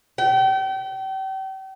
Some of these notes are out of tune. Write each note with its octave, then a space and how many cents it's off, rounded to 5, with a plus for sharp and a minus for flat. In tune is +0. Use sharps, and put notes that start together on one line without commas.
G5 -35